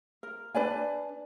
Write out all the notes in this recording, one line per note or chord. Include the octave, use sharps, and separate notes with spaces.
A#4
D4 B4 D5 G#5